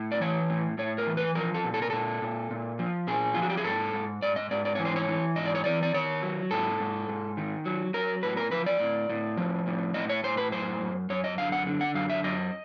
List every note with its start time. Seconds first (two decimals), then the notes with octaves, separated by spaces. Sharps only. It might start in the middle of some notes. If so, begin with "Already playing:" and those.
Already playing: A2
0.12 D5
0.21 E3 C#5
0.50 A2
0.78 A2 C#5
0.98 A#4
1.07 E3
1.17 B4
1.35 F3 A#4
1.54 A4
1.65 A#2
1.74 A4
1.82 A#4
1.90 A#2 A4
2.22 A#2
2.51 A#2
2.79 F3
3.07 A#2 G#4
3.34 F3 F4
3.42 F#4
3.50 G4
3.57 G#4
3.65 G#2 A4
3.93 G#2
4.22 G#2 D5
4.36 D#5
4.51 G#2 D5
4.65 D5
4.75 E3 C#5
4.85 C5
4.96 C#5
5.08 E3
5.36 G#2 D#5
5.46 D5
5.55 C#5
5.64 E3 D5
5.83 D5
5.94 D#3 C#5
6.23 F#3
6.51 G#2 A4
6.80 G#2
7.09 G#2
7.37 D#3
7.65 F#3
7.94 F#3 A#4
8.23 A2 B4
8.37 A#4
8.51 F3 B4
8.66 D5
8.80 A2
9.10 A2
9.37 F3
9.66 A2
9.94 A2 D#5
10.09 C#5
10.23 A2 C5
10.37 B4
10.52 F#2 C5
10.80 F#2
11.10 F#2 C#5
11.24 D#5
11.38 D3 F5
11.52 F#5
11.67 D3
11.81 F#5
11.95 F#2 F5
12.10 E5
12.24 F#2 D#5